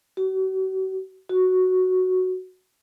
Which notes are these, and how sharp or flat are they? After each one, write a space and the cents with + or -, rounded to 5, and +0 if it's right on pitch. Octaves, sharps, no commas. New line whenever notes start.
F#4 +40
F#4 +0